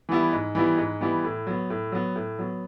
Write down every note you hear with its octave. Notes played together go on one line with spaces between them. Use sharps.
E3 G3 B3 E4
G#2
E3 G3 B3 E4
G#2
E3 G3 B3 E4
A2
F#3 B3
A2
F#3 B3
A2
F#3 B3